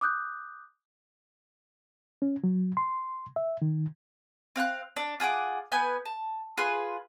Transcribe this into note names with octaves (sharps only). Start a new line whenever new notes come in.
D6 D#6 F#6 G6
C#4
F#3
C6
E5
D#3
C4 F5 G5 F#6
D4 D5
F4 G#4 F#5 D6
B3 B4 G#5 G6
A5
F4 G#4 B4 C6